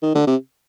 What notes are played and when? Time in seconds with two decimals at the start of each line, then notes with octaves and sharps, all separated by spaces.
0.03 D#3
0.15 D3
0.27 C3